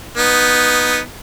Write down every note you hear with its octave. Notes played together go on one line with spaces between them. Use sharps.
B3 D#4